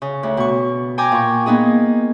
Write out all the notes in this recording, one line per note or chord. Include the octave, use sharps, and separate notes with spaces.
C#3
D2
B2 C#6
G5 G#5 A#5 D6
A#2 C#6
A#3 B3 D#4 G#4